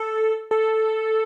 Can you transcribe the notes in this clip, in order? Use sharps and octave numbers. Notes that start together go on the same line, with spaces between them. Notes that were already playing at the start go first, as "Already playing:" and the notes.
Already playing: A4
A4